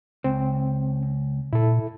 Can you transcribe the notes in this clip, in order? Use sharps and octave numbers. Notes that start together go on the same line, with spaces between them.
C#2 C4
A#2 E4 A4